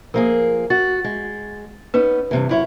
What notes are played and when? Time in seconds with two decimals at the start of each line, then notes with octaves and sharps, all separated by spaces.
0.14 F3 A#3 G#4 A#4
0.70 F#4 A6
1.04 G#3
1.94 B3 C#4 D#4 B4
2.31 G2 C3 E3
2.49 F#2 E4 C#5